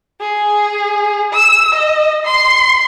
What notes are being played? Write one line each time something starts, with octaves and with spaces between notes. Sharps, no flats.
G#4
E6
D#5
C6